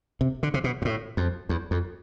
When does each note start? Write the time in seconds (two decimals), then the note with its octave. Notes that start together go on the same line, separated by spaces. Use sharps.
0.21 C3
0.43 D3
0.54 C3
0.64 B2
0.82 G2
0.85 A2
1.17 F2
1.49 E2
1.71 F2